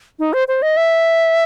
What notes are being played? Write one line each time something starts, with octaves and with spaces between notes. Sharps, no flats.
D#4
C5
C5
D#5
E5